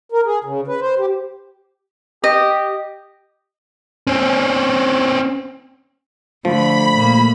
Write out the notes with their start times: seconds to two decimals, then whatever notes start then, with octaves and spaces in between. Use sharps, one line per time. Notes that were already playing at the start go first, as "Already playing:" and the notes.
0.12 A#4
0.26 G#4
0.44 C#3
0.67 B4
0.81 C5
0.99 G4
2.24 G4 D#5
4.07 C4 C#4
6.45 D3 F3 A3 B5
6.95 A#2 A#3